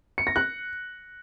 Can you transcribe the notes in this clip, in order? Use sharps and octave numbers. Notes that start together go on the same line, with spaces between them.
C#7
A#6
F#6